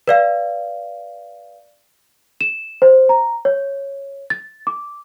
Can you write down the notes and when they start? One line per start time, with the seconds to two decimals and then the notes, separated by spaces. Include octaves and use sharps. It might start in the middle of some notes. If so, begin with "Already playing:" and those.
0.08 B4 D5 F5
2.41 E7
2.82 C5
3.09 A#5
3.45 C#5
4.30 A6
4.67 D6